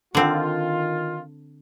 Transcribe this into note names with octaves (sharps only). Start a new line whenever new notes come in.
D3 D#3 C4 F4